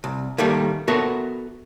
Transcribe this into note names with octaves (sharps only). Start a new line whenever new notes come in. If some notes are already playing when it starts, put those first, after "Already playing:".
C2
D#3 G3 A3 A#3
B3 F#4 A4 A#4 E5